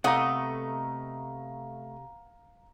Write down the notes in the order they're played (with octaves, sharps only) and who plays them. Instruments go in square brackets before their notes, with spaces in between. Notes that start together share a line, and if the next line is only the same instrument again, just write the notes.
[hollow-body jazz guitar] C3 [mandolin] A3 D#5 [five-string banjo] B3 F#5 [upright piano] F5 A#5